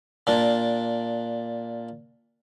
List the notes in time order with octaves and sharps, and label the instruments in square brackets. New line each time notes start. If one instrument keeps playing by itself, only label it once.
[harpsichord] A#2 D4